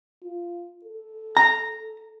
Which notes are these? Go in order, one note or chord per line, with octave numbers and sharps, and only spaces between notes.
F4
A4
A#5